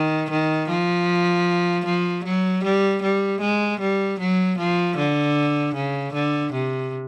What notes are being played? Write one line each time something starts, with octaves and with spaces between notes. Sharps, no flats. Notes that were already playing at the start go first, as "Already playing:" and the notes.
Already playing: D#3
D#3
F3
F3
F#3
G3
G3
G#3
G3
F#3
F3
D3
C#3
D3
C3